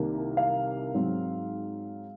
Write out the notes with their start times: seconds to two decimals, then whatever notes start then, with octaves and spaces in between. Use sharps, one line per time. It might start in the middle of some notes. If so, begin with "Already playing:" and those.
Already playing: C2 C3 D#3 A#3
0.37 F5
0.94 G#2 F#3 C4